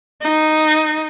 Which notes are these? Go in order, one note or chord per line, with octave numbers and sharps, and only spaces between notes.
D#4